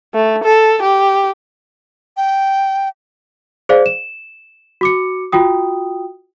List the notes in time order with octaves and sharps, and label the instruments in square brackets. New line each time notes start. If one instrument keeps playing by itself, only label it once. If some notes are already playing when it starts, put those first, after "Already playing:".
[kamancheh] A3
A4
G4
[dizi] G5
[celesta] G#4 C5 D5 F5
E7
F#4 D6 C#7
F4 F#4 G5 D#6